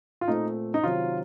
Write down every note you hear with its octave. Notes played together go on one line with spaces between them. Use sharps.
F4
A#2 A3 C4 D#4
D#4
C3 D#3 F#3 C4 F4